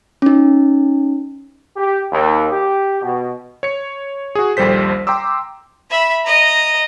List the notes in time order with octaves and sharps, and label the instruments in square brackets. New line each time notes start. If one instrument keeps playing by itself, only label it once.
[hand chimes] C#4 D#4
[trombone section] G4
D#2
G4
B2
[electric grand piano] C#5 C#7
F#4 G#4
A#1 D#2 G3 A4 C5 B6
G5 A#5 C6 D6 E6
[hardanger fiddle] E5 B5
D#5 A#5